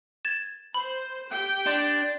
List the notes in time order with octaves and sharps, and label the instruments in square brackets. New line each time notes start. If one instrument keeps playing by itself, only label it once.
[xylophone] G#6 A6 E7
[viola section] C5 [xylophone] B5
[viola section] G4 G5
[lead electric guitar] D4 [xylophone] C6